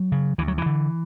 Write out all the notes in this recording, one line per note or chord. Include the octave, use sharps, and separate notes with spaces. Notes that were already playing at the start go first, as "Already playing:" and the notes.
Already playing: F#3
C#3
D2 E3
F#3
E3
D3